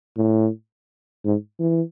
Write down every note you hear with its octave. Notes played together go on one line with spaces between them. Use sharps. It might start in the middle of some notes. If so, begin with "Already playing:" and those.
A2
G#2
E3